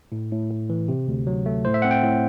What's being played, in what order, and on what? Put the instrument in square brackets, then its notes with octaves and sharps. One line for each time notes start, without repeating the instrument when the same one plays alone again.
[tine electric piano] A2
A2
A2
E3
C3
D2
F#3
A3
A2 C5
E5
C4 F#5
G5
A2